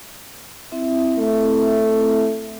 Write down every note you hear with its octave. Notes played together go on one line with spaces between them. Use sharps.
C4 E4 E5
A3